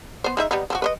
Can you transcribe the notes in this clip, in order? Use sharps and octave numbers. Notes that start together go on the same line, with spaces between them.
B3 C5
G#3 D#4 E5
G3 B3 D#4
F3 C4 F#4
B4 C5 D#5